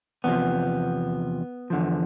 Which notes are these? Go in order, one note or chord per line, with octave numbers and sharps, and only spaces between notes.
E2 C3 F3 B3
E2 D3 F3